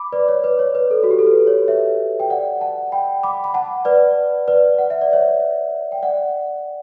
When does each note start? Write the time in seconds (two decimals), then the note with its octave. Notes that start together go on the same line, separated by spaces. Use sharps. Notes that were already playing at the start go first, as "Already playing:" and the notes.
Already playing: B5 D6
0.12 B4 D5
0.28 C#5
0.44 B4
0.59 C#5
0.75 B4
0.91 A4
1.03 F#4
1.11 G4
1.19 A4
1.27 B4
1.47 C#5
1.68 C#5 E5
2.20 G5
2.30 D5 F#5
2.61 F#5 A5
2.92 G5 B5
3.23 B5 D6
3.44 B5
3.54 F#5 A5
3.85 B4 D5
4.48 B4 D5
4.78 F#5
4.90 E5
5.01 D5
5.13 C#5 E5
5.92 G5
6.03 D5 F#5